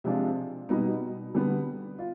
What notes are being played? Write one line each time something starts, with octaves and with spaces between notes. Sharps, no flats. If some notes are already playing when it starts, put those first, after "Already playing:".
C3 F3 G#3 D4 F4
B2 G3 B3 D#4
D3 G3 B3
F4